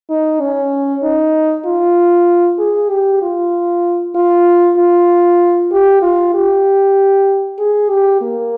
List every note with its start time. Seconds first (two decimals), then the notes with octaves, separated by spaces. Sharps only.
0.10 D#4
0.41 C#4
1.03 D#4
1.66 F4
2.59 G#4
2.90 G4
3.22 F4
4.15 F4
4.78 F4
5.72 G4
6.02 F4
6.35 G4
7.59 G#4
7.90 G4
8.22 A#3